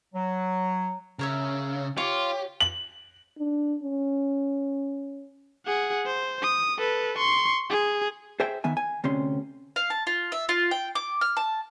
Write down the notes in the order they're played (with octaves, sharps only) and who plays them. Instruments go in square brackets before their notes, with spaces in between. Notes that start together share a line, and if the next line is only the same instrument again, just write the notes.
[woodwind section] F#3
[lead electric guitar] C#3 [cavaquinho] A#4 C#5 E5
[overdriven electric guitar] F4 [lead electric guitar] G4 [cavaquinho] C#5 D6
[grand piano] F#7
[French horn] D4
C#4
[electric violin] G#4 F#5
C5
D#6
A4 B4
C6 C#6
G#4
[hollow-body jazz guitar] G#4 C5 E5 G5
D#3 B3 E5 G#5
G#5
D2 C3 C#4 C6
[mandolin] F5
A5
F4
E5
F4
G5
D6
F6
A5